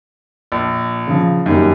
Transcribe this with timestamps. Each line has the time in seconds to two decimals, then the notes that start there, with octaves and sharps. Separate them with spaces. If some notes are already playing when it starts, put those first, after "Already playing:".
0.52 A#1
1.07 C#3 F3
1.46 F#2 D#3 G3 A#3